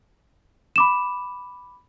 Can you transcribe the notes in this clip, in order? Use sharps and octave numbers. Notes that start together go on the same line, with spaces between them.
B5 D6 E7